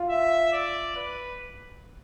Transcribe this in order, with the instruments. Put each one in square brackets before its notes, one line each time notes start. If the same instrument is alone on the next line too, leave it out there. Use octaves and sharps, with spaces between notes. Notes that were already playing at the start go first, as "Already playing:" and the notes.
Already playing: [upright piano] F4
[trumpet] E5
D5
B4